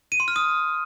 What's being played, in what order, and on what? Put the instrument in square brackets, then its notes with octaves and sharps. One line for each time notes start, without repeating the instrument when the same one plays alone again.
[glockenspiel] D#7
C6
F6
D#6